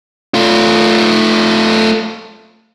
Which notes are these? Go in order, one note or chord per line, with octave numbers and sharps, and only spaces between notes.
A3 F4